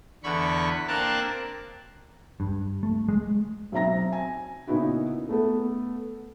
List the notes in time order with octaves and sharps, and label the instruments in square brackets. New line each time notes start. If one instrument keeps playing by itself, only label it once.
[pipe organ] E2 D3 B5 C#6
A#3 C4 D4 A#4 A5 F#6
[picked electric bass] G2
A3
G#3
[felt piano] B1 C4 E5 A#5 A#6
G#5
A#2 C#3 B3 D#4 E4 F#4
A3 B3 A4